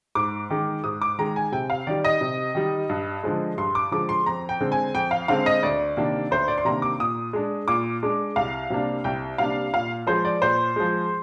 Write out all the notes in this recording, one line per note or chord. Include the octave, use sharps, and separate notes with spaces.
G#2 D6
D#3 G#3
G#2 D#6
D6
D#3 G#3 A#5
G#5
C3 G5
F5
D#3 G3 D5
D#5
C3
D#3 G3
G2
D3 F3 G#3
G2 C6
D6
D3 F3 G#3 D6
C6
F2 A#5
G5
D3 G#3 C4
G#5
F2 G5
F5
D3 G#3 C4 F5
D#5
D2 D5
C3 D#3 A#3 D4
D2 C5
D5
C6
C3 D#3 A#3 D4 A#5
D6
A#2 D#6
G#3 D4
A#2 D6
G#3 D4
C2 F5
C3 G3 A#3 D4
C2 G5
C3 G3 A#3 D4 F5
A#2 F5
F3 G#3 C5
D5
A#2 C5
F3 G#3